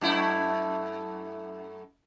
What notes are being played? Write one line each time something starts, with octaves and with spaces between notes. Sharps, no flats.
F#2 A3 E4